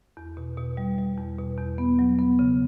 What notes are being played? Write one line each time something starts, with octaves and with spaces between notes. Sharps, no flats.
E2
B2
B2
G3
G3
E2
B2
E2
B3
F#3
B3
C#3